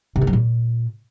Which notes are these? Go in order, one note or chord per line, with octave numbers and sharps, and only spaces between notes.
C3
A#3
F#3
A#2